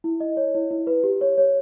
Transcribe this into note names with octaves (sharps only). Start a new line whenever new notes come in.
E4
D#5
C#5
E4
E4
B4
G4
C#5
C#5